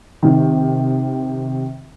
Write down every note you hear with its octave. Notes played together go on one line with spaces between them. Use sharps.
C3 D#3